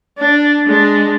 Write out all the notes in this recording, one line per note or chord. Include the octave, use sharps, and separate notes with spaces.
D4
G#3 D4